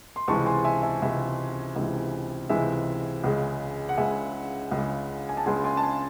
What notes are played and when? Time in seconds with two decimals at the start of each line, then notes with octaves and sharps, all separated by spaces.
0.16 C6
0.28 C#2 C3 E3 G#3 A5 C#6
0.46 G#5 C6
0.64 E5 G#5
0.83 E5 G#5
1.02 C#2 C3 E3 G#3 E5 G#5
1.76 C#2 C3 E3 G#3
2.49 C#2 C3 E3 G#3 E5 G#5
3.24 C#2 C#3 G#3
3.89 F#5
3.97 C#2 C#3 G#3 E5 G#5
4.71 C#2 C#3 G#3
5.29 G#5
5.37 A5
5.46 C#2 C#3 G#3 G#5 C6
5.64 G#5 C6
5.77 A5
5.83 G#5 C6